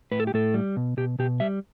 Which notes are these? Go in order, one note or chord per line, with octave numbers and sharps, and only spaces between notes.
A2 B4
A4
G4
A2 A4
G3
B2
B2 G4
B2 G4
G3 E5